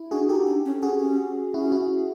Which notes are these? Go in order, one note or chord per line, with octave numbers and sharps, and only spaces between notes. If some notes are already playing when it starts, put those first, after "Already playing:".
Already playing: E4
D4 F#4 G#4
D#4 G4 A4
D4
C#4
C#4 F#4 G#4
C#4
C#4 E4 F#4
E4 F#4